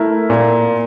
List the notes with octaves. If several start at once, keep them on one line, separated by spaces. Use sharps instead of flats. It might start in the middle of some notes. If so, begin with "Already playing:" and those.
Already playing: A3 E4 A#4
A#2